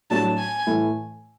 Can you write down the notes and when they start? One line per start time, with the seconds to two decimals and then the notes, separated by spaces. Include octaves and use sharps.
0.10 A2 F#3 A3 D4 A5
0.38 G#5
0.66 A2 E3 A3 E4